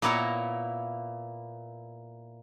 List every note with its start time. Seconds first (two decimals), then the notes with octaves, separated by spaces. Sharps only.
0.02 A#2 A#3 B3 E4 C#5 A#5